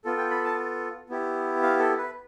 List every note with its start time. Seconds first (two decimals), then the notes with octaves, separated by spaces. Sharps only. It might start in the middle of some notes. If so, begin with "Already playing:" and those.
0.05 B3 F4 A4
0.17 G5
0.31 B5
0.44 A5
1.09 B3 E4 G4
1.63 F5
1.79 A4
1.98 B4